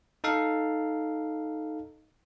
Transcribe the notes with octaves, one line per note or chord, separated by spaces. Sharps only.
D#4 A4 F5